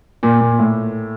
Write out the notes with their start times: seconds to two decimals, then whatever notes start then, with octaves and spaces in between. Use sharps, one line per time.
0.23 A#2
0.41 A#2
0.59 A2